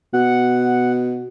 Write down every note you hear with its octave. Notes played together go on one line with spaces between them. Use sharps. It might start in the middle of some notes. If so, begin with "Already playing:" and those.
B2 F#5